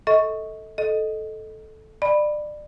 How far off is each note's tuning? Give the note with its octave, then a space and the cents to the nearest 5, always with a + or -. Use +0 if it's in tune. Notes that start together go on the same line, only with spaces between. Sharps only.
A4 +5 D#5 +30 C#6 +0
A4 -10 D#5 -5
D5 +25 B5 +0